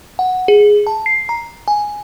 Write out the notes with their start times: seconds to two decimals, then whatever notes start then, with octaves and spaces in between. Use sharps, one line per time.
0.19 F#5
0.48 G#4
0.87 A5
1.06 C7
1.29 A#5
1.68 G#5